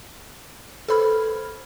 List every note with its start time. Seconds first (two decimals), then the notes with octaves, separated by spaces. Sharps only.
0.89 A4 B4 C5 B5 F6 G#6